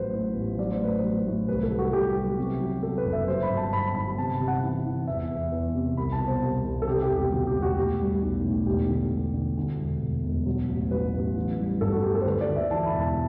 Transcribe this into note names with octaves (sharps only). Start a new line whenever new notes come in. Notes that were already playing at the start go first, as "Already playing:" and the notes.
Already playing: A1 F#3 B4 C5
A2
A1
F#3 D5
C5
A2 B4
C5
F#3
A2
C2 B4
A4
C2
F#4
F#3 G4
F#3
C3
F#3
F#3 A4
B4
F#1
E5
F#3 C5
B5
G1
A5
G2 B5
G1 B5
C3 A5
C3
F#5
E3
E3
E2 E5
E2
E2
C3
C2 B5
A5
B2
C5
C2
C2
A4
C3 G4
G4
E1
G4
D2 F#4
G4
E1
F#4
A2 G4
G3
B1
A2
E1 G4
D3
E1
D3
D2
E1
E1
E1
F#3
A1
F#3 B4
A1
E3
G3
G2 A4
F#4
A1 G4
A4
C5
D2 B4
D5
D2
E5
E3 A5
B5
E1
A5